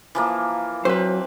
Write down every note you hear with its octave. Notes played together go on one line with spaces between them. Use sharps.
E3 F3 A#3
F#3 C4 B4 C5